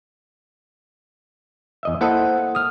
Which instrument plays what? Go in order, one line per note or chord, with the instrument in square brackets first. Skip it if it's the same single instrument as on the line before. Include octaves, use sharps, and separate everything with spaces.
[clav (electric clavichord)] E2 D#5 E5
[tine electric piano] A#3 C5 F#5 [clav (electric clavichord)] E4 A4 D#5
[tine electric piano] D#6 F6